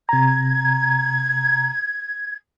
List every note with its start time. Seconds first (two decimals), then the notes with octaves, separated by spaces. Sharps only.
0.09 C3 A#5 G#6